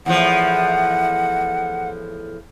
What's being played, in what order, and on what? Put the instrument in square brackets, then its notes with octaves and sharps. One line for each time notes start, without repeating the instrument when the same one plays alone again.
[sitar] E2 A2 F3 [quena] F#5